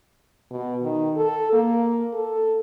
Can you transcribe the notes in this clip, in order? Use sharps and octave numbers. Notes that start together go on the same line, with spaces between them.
B2
D#3
A4
A#3
A4